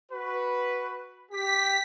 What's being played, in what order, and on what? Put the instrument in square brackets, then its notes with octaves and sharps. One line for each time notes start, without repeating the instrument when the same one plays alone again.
[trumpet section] F#4 B4
[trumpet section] G4 [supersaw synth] B6